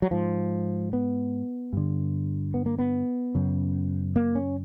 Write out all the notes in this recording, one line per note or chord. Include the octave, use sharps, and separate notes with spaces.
F#3
G#2 F3
B3
G2 D3
B3
A#3
B3
F#2 C#3
A#3
C#4